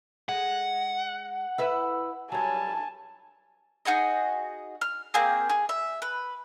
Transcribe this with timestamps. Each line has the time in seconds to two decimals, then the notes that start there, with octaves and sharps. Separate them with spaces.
0.29 G#3 F#5
1.58 E4 B4 E5
2.32 F#3 G3 G#5 A5
3.85 D#4 F#4 G#4 D#5
4.81 F6
5.14 A#3 C4 G#4
5.49 G#4
5.69 E5
6.02 B4